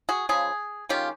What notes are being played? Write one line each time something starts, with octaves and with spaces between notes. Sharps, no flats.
F#4 G#4
C#3 F3 G#3 G#4
D#3 G#3 C#4 F4 G4